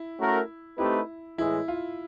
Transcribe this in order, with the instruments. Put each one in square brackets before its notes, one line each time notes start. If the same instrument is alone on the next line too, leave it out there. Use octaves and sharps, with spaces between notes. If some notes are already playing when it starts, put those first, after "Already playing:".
Already playing: [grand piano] E4
[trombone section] A3 C#4 F#4 A#4
[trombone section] A3 C4 D#4 G4 B4 [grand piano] E4
[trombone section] A2 E3 G#3 [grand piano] E4
[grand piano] F4